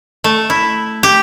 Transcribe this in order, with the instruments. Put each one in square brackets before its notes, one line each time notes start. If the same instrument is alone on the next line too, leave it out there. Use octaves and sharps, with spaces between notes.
[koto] A3
E4
G4